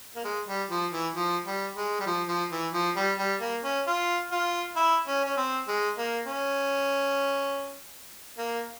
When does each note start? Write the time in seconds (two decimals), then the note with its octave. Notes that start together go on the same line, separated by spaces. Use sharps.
0.16 A#3
0.24 G#3
0.47 G3
0.70 F3
0.92 E3
1.15 F3
1.46 G3
1.75 G#3
2.00 G3
2.06 F3
2.28 F3
2.51 E3
2.73 F3
2.96 G3
3.18 G3
3.41 A#3
3.64 C#4
3.87 F4
4.31 F4
4.76 E4
5.07 C#4
5.25 C#4
5.37 C4
5.68 G#3
5.98 A#3
6.27 C#4
8.38 A#3